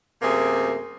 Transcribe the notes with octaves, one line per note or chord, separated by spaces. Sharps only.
F#2 C3 A3 A#3 C4 G#4